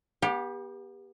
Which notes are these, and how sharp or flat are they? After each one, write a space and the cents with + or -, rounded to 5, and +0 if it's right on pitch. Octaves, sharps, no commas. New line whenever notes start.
B3 -35 G4 +15